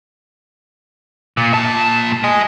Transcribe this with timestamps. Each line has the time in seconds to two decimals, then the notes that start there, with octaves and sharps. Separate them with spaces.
1.37 A#2
1.54 A#2 A5
2.24 D#5 G#5